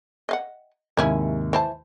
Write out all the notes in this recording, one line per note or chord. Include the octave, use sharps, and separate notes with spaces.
D#5 F5 F#5
D#2 G#2 C3 A#3 C#4 E4
E3 C5 A5